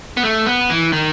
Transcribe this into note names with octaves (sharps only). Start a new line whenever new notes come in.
B3
A3
B3
E3
D#3